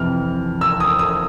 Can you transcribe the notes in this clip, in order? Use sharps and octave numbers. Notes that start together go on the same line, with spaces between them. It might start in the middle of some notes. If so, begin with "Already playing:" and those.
Already playing: F2 C3 E3 F6
E6
D#6
D#6